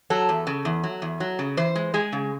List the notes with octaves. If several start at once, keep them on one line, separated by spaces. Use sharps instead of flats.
F#3 A4
E2
C#3
E2
F#3
E2
F#3
C#3
E3 C5
G#3
G#3 G#4
C#3